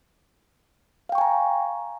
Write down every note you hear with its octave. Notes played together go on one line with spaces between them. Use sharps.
F5 G5 G#5 A#5 C#6